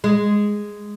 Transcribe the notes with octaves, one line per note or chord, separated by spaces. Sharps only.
G#3